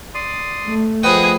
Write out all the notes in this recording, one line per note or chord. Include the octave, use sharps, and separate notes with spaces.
D5 C6 D#6
A3
F3 G#4 B4 D#5 F#5 G5 D#6